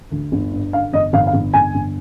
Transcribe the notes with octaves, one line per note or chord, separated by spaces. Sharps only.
D2
G1
G2
D3 F5
G1 D#5
G1 F5
F5
G1
G1 G#5
G1